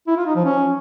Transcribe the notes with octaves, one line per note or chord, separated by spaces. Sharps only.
E4
F4
D#4
F3
C#4